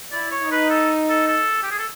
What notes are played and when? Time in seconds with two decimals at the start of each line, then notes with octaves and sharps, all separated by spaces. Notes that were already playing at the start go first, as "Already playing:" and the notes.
0.12 E4 D5
0.31 C#5
0.41 D#4
0.51 B4
0.70 A4
1.09 A4
1.28 A4
1.63 G4
1.71 G#4
1.78 A4